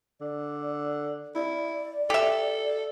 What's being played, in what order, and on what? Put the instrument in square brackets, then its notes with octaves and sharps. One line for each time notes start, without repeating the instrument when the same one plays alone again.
[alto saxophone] D3 [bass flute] D5
[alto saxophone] E4 [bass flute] D5
[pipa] G4 E5 [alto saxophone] A4